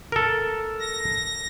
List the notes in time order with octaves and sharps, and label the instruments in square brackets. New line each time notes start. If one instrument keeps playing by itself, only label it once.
[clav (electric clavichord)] A4 A#4
[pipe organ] A#6